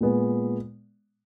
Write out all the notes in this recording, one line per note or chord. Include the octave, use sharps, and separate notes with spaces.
A#2 G#3 B3